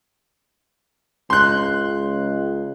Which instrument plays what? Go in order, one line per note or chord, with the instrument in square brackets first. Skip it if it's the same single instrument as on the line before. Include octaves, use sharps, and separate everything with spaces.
[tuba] C#2 [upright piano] C6 F#6